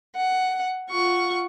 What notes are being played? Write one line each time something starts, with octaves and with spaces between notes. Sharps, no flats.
F#5
F4 F#5 C#6